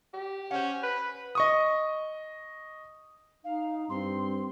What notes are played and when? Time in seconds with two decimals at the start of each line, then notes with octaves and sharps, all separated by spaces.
0.14 G4
0.51 C#4 C5 F#5
0.83 B4 B5
1.35 D#5 C#6 D#6
3.44 D#4 F5
3.90 G2 C4 C6